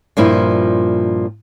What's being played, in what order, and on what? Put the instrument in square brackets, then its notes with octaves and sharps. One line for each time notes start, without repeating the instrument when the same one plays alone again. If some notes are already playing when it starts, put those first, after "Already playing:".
[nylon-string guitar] G2 A#2 F3 E4